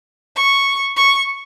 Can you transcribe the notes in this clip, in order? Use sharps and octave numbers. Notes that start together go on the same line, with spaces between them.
C#6
C#6